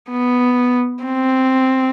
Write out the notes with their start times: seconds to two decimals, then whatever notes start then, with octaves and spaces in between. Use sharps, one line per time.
0.10 B3
1.04 C4